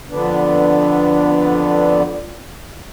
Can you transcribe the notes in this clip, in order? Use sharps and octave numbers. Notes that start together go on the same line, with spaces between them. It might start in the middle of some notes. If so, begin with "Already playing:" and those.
F2 D3 B3 D4